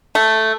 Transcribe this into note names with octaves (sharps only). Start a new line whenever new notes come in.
A3